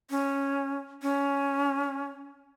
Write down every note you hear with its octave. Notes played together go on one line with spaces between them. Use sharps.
C#4
C#4